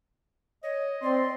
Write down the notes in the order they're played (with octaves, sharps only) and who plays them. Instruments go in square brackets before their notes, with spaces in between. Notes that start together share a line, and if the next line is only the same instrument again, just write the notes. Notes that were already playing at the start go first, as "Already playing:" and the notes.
[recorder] C#5 [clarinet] D#5
[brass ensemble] C4 [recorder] D5 [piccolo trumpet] C6